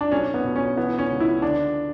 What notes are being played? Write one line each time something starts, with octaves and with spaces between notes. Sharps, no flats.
D4
B1 C#4
B3
B2
C#4
E3 B3
C#4
C#2
E4
D3 D4